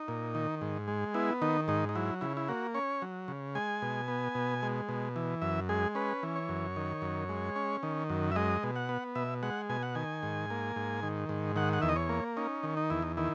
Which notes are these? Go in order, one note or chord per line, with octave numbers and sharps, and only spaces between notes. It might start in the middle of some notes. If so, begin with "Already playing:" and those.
Already playing: D#4
A#2
D#3
G#2
G#3
B3 E4
D#3 D#4
G#2 D#4
D#4
F#3 E4
C#3 E4
E4
A#3 F#4
C#4 C#5
F#3
C#3
G#3 G#5
B2
B3
B2
G#3
B2
E3
F#2 E5
G#3 G#4
C#4 B4
E3
C#5
F#2
D#3
F#2
G#3
C#4
D#3
F#2
E5
G#3 D#5
B2
F#5
B3
B2 E5
G#3 F#5
B2 G#5
F#5
D#3 G#5
G#2
A#3
G#2
D#3
G#2
D#3 F#5
F#5
E2 E5
D#5
C#5
A#3
C#4 D#4
D#3
D#4
E2 E4
D#4
D#3 E4